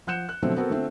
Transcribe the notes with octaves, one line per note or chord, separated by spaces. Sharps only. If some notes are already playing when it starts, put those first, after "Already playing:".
F3 F#5 F#6 G6 C#7 E7
F#6
B2 D3 F3 F#3 A3 C4
B3 C4 F#4 A4 A#4
D3 A3 C4 F4